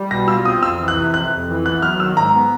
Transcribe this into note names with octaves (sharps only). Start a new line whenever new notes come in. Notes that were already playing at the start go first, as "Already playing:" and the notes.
Already playing: G3
B2 A#6
F4 E6
C4 D#6
F2 E6
E3
F#6
C3
F2 F#6
F2
E3
B3 F#6
F#3 F6
D#3 E6
G#2 A#5
B3